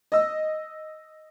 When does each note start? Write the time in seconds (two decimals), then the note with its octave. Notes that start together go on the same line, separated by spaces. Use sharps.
0.12 D#5 E6